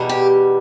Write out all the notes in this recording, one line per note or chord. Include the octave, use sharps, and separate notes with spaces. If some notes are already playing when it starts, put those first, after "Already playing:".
Already playing: E2 B2 G3
G4